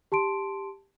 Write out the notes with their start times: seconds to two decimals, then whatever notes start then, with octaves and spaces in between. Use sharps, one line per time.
0.12 G4 A5 C6 D7